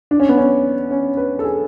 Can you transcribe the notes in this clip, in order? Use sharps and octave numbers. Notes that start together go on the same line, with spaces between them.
D4
C#4
B3
C#4
C#4
B4
A4
G#4